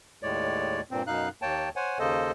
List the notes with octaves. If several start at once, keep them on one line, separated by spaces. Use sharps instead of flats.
D#2 A2 G#3 C#5 D5
G2 A#2 C4
F#2 B2 D#4 F5 F#6
D#2 A#3 C#5 G5 A5
C5 C#5 F#5 G#5
D#2 C#3 A#3 A4 C5 D#5